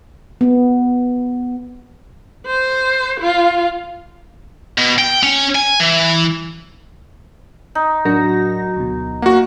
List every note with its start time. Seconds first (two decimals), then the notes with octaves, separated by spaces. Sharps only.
0.41 B3
2.46 C5
3.20 F4
4.78 B2
4.99 G5
5.23 C#4
5.55 G#5
5.80 E3
7.75 D#4
8.05 A2 F#3 D4 F#4 A#4 A#6
8.76 D2 B2
9.22 A#3 F#4 F#5